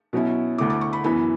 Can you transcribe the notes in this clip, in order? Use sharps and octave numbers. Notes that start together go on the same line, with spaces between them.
B2 F#3 C#4 E4
D2 D3 A3 E4 D6
D6
C#6
B5
F#2 E3 B3 B5